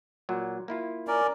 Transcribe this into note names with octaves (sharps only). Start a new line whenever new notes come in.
A#2 F#3
A#3 E4 F4
C#4 A#4 D5